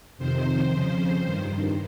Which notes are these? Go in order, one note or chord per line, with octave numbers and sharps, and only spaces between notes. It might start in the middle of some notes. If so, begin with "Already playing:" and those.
F2 C3 D#3 C5
F2 C#3 F3
G2 D#3